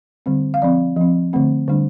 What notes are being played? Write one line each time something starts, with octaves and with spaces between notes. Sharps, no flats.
D3 G3 C4
F5
F3 C4 D5
F3 C4
D3 A3 C4
D3 G3 D4